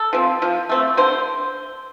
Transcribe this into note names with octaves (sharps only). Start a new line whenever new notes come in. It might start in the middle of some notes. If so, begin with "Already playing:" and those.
Already playing: A4
F3 C4
F3
A3 C4
D3 C5